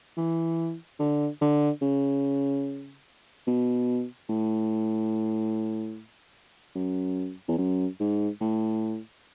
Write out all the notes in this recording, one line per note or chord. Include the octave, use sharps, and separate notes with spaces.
E3
D3
D3
C#3
B2
A2
F#2
E2
F#2
G#2
A2